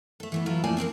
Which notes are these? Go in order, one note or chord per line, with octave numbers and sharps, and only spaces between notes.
A3 A4
E3 A3 B3
E3 F#3 E4 F4 A4
F2 F3 A3 A#3 D5 G#5
C4 D4 G4 A#4